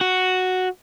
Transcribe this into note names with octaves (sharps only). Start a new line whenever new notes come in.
F#4